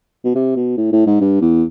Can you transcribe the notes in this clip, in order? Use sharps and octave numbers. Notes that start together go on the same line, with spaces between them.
B2
C3
B2
A2
A2
G#2
G2
E2